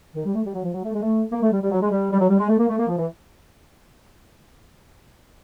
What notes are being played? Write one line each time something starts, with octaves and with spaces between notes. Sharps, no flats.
D#3
G3
A3
G3
F#3
F3
F#3
A3
G#3
A3
A#3
A3
G3
G3
F#3
G#3
G3
G3
F#3
G3
G#3
A3
A#3
A3
A#3
F3
E3